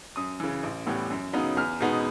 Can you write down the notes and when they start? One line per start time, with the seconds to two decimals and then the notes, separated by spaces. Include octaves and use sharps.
0.16 F#2 D#6
0.40 C#3 E3
0.63 A1
0.86 A2 E3 G3 B3
1.10 F#2
1.33 C#3 F#3 B3 D#4
1.57 E2 F6
1.80 B2 G#3 B3 D#4